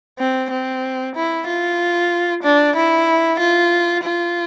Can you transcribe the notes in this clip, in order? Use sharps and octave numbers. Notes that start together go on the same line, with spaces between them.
C4
C4
E4
F4
D4
E4
F4
F4